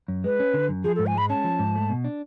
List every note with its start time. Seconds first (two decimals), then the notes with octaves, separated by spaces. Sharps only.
0.08 F#2
0.24 G#3 B4
0.39 C#4
0.54 D3
0.69 F#2
0.84 F3 G#4
0.96 A4
0.99 G#2
1.07 G#5
1.15 G#3 B5
1.30 C#4 A5
1.44 F3
1.59 G#2
1.76 A3
1.90 B2
2.04 D4